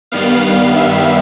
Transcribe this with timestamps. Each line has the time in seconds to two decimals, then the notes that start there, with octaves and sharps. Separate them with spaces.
0.12 G2 D#3 G3 B3 F5
0.76 E5